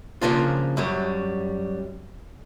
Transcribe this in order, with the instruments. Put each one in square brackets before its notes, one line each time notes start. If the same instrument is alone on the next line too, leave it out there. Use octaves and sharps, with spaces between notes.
[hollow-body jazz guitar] C#3 F3 A#3 D4 F4
F#2 F#3 G3